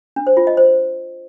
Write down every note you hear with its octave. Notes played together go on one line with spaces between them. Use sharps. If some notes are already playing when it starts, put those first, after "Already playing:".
D4
C5
F4
D#5
C5